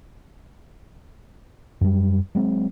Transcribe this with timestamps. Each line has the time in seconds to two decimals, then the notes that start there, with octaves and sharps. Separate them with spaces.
1.81 F#2 G3
2.35 F#3 G#3 C4